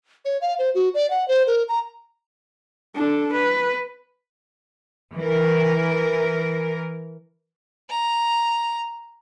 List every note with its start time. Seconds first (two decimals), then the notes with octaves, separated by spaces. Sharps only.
0.25 C#5
0.41 F5
0.59 C5
0.75 F#4
0.94 D5
1.10 F#5
1.28 C5
1.47 A#4
1.68 A#5
2.95 D4 A4
3.33 B4
5.16 E3 A#4
7.90 A#5